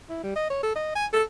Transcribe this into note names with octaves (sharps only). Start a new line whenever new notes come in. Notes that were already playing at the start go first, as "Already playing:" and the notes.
E4
G3
D#5
C#5
A4
D#5
G#5
A4